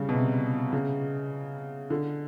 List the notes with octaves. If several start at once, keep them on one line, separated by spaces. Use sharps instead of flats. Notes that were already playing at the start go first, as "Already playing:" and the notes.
Already playing: C#3 G3
B2
C3
C#3
D3